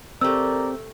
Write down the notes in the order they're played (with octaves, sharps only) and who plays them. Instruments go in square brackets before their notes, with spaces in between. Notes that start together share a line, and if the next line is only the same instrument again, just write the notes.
[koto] C3 A3 [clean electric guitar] C4 G4 [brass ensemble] A#4 D5 [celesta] E6